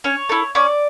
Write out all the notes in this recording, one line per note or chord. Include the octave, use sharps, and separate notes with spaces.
C#4 C#5
E4 A4
C#4 D5